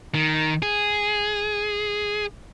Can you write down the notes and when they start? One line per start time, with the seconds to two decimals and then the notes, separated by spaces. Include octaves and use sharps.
0.15 D#3
0.62 G#4